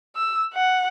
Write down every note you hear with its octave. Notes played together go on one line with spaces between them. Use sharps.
E6
F#5